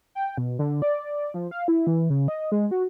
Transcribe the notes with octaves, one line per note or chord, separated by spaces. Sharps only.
G5
B2
D3
D5
F3
F5
E4
E3
C#3
D#5
G#3
F#4